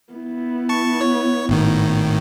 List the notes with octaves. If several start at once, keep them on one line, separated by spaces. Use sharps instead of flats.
B3 E4
A5 C#6
C#5
G#1 A2 D#3